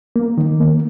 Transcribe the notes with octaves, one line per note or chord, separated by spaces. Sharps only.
A#3
D#3
A#3